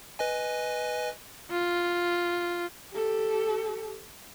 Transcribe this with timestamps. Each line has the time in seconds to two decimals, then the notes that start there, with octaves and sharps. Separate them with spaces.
0.19 B4 D#5 G#5
1.51 F4
2.92 G4 A4